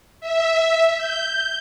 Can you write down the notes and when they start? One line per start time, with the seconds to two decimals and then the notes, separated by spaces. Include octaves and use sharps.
0.21 E5
0.97 G6